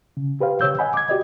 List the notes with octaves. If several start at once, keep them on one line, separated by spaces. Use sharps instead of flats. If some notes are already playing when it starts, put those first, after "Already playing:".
C#3
G4 B4 C5 F5
C#3 G4 C#5 E6 G6
D#5 F#5 G#5 B5
D6 G#6
F#4 G4 D5 D#5